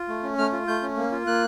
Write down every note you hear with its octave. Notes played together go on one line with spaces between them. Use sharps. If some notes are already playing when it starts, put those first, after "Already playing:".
Already playing: F4
A3
C#4
A3 F6
F4
A3 G6
C#4
A#3
F4
A#3 F#6